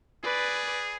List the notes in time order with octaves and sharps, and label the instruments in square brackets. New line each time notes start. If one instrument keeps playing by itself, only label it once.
[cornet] G#4 [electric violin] B4 D5